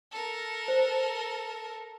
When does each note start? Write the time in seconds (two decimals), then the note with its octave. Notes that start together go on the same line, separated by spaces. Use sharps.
0.12 A4 A#4
0.68 C5